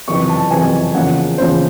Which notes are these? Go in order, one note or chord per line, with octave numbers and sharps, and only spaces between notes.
F#1 F2 C3 E3 C#6
A5
F#1 F2 C3 E3 G#5
E2 C#3 F3 A#3 F#5
E2 C#3 F3 A#3 C5